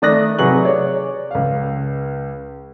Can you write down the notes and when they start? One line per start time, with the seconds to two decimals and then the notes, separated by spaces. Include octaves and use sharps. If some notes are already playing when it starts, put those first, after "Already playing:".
0.02 D#3 A3 D5 D#6 F#6 A#6
0.39 C3 F#3 G#4 B4 C#6 F#7
0.65 C#5 D5
1.31 C#2 F5